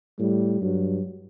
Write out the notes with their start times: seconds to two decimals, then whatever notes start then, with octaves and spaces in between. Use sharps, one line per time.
0.19 A2 G3
0.61 G2 F#3